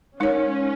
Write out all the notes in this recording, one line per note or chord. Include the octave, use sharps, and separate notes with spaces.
G#3 C#4 D#4 A#4 C#5